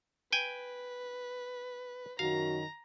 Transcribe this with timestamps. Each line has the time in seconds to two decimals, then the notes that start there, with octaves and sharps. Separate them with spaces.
0.32 B4 G5 G#5
2.19 F#2 D#3 F#4 F5 A#5